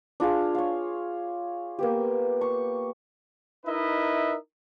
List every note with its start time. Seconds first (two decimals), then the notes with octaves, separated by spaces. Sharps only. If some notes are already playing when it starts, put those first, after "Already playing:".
0.20 D4 F4 G#4 F5
0.55 C#5 F5
1.79 A#3 B3 G4
2.41 C#6
3.66 D#4 E4 A#4 B4 D#5 E5